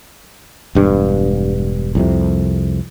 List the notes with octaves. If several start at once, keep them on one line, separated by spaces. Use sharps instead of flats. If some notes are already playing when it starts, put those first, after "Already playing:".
E1 G2
C2 F2 C3